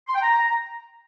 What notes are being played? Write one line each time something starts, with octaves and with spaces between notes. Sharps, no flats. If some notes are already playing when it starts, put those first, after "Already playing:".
C6
G5
A#5